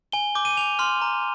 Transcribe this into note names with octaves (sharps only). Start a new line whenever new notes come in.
G#5 G7
D6 G6
D#7
G#5 F7
C6 F6
A#5